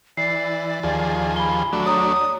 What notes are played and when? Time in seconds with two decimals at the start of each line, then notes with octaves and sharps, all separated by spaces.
0.17 E3 D5 C7
0.83 D#2 F3 G#4
1.36 B5 G7
1.73 F#3 A3 D4
1.86 C#5 A#5 D#6